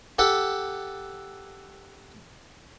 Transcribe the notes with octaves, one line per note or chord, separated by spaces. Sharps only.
G4 A4 F#5